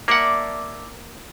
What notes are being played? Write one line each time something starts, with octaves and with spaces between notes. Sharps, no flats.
A#3 D5 E5 F#5 A5